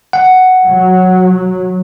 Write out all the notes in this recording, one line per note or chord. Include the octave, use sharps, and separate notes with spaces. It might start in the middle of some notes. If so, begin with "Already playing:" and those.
F#5
F#3